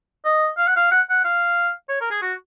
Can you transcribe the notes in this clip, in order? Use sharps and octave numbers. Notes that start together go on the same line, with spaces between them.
D#5
F5
F#5
F5
F#5
F#5
F5
C#5
A#4
G#4
F#4